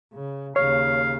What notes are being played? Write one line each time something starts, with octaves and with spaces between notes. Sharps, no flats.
C#3
D#2 C#3 C#5 F5